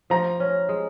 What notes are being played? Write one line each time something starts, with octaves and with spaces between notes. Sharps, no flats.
F3 A#5
C#4
G#3